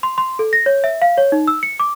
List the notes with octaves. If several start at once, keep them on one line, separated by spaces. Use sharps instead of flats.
C6
C6
A4
A#6
C#5
E5
F5
C#5
D#4
E6
C#7
D6